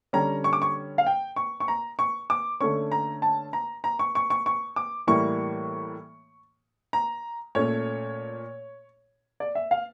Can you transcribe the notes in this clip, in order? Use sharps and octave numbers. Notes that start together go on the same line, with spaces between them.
D3 G3 C#4 A#5
C#6
D6
C#6
F5
G5
C#6
C#6
A#5
C#6
D6
D3 A3 C#4 C#6
A#5
A5
A#5
A#5
C#6
C#6
C#6
C#6
D6
A2 E3 G3 A#3 C#6
A#5
A#2 A3 C#4 C#5
D5
E5
F5